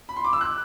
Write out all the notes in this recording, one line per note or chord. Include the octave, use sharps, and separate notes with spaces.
B5
C6
D6
E6
F#6